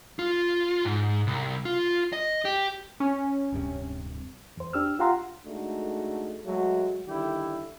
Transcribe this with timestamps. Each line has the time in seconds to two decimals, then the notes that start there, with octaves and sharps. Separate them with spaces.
0.19 F4
0.85 G#2
1.27 C2
1.65 F4
2.13 D#5
2.45 G4
3.00 C#4
3.52 D1 G2 C3
4.57 E2 C5
4.73 D4 G4 E6 F6
4.99 F4 G4 F5 F#5 A#5 C6
5.46 G#3 A3 D4 D#4 F#4
6.46 F#3 G#3 A3 F#4
7.07 D3 D#3 G3 E4 G4